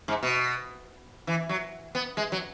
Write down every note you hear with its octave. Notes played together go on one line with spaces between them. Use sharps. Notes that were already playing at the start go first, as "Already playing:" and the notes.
G#2
B2
E3
F#3
B3
G#3
F#3